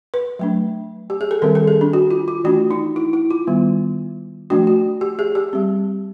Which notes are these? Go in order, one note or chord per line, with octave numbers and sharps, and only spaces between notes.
B4
F#3 A3 D4
G4
G#4
A4
D#3 G3 C4 A#4
A4
G#4
D4
F#4
F4
F4
E3 A3 D4 F#4
D#4
E4
E4
F4
D#3 G3 B3
F3 A3 D4 F#4
F#4
G4
G#4
G4
G3 C4